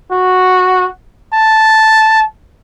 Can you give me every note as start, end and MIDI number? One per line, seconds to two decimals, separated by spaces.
0.11 0.85 66
1.33 2.22 81